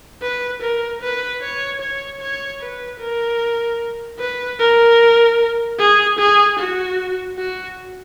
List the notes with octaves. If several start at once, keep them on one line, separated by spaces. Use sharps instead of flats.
B4
A#4
B4
C#5
C#5
C#5
B4
A#4
B4
A#4
G#4
G#4
F#4
F#4